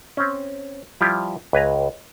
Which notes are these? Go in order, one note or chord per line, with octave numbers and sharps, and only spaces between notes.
C4 C#4
F3 G3 E4 F4 G4
C#2 B4 G#5 A#5